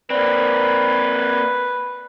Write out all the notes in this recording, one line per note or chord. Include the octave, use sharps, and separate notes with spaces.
A#3 C4 B4 D5